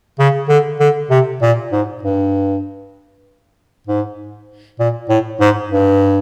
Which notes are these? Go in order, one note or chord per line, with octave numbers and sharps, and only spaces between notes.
C#3
D3
D3
C3
A#2
G#2
G2
G#2
A#2
A2
G#2
G2